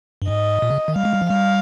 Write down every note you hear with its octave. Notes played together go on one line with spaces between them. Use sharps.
G2
G#2 D#5
A#2
C#3
D#3
G3 F5
G#3
G3
F3
G3 F5